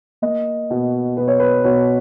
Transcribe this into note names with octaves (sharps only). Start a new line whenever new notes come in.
A#3 D#5
B2
B2 B4
C#5
B4
B2 C#5